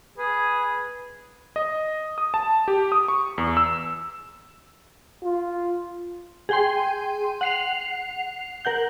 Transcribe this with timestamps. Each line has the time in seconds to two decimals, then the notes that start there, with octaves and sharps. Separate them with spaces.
0.18 G#4 B4
1.56 D#5
2.18 D#6
2.34 A5
2.68 G4
2.92 D#6
3.08 C#6
3.38 E2
3.57 E6
5.23 F4
6.49 G#4 G5 C6
7.41 F#5 C7 F7
8.65 A#4 F#5 G6